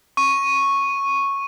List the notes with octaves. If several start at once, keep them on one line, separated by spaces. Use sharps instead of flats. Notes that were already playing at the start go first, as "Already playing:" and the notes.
C#6 D#7